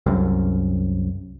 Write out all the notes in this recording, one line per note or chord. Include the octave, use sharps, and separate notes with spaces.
C2 F#2